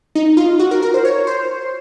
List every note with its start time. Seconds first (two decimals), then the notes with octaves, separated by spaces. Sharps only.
0.15 D#4
0.37 F4
0.59 F#4
0.71 A#4
0.82 A#4
0.94 C5
1.05 C#5
1.27 C5